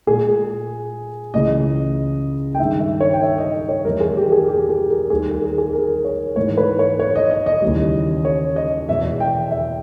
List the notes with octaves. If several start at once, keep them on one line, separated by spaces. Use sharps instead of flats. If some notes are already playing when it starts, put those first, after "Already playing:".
A#2 G#3 G#4
C#2 C#3 E3 G#3 D#5
G5
G2 D#3 G#3 E5
E5
C#5
G5
E5
D#5
D#5
C#5
E2 D#3 G3 A#4
G#4
G4
G#4
G4
G#4
A#4
D#2 D#3 G3 G#4
G#4
A#4
G#4
A#4
C#5
G#2 E3 G#3 C#5
B4
C#5
C#5
D#5
D#5
D#5
D#2 C#3 E3 G3
C#5
D#5
E2 B2 G#3 E5
G5
E5